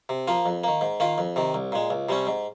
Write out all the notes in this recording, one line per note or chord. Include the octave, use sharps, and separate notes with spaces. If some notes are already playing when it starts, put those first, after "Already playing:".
C3
F3 A#3 F4
F2
D#3 A#3
G#2
D#3 A#3 F4
F2
C3 D#3
C2
A#2 G#3
C#2
C3 G3 C#4
G#2